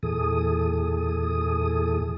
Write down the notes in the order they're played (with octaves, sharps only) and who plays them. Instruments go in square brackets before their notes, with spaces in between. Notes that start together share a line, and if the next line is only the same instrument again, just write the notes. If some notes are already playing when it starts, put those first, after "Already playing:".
[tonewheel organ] E2 A#2 E3 G#4 A4 D#6